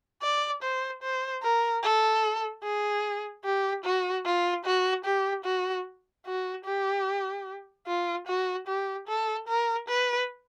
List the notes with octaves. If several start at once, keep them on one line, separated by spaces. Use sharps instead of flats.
D5
C5
C5
A#4
A4
G#4
G4
F#4
F4
F#4
G4
F#4
F#4
G4
F4
F#4
G4
A4
A#4
B4